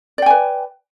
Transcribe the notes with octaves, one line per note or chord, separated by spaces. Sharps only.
B4 D5 G5 G#5